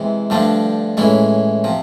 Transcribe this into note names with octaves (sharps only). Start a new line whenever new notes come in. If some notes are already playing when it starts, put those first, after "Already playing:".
Already playing: C3 E3 G#3
G2 D3 F3 A3 D4
A2 E3 G#3 C#4 E4
C3 F3